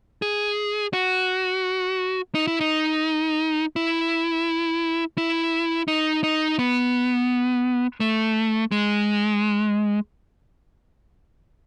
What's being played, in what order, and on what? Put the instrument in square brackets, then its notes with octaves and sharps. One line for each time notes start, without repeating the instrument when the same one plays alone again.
[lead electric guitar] G#4
F#4
D#4
E4
D#4
E4
E4
D#4
D#4
B3
A3
G#3